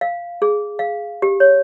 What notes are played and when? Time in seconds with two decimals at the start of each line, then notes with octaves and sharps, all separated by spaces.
0.01 F5
0.42 G#4
0.79 F5
1.22 G4
1.40 C#5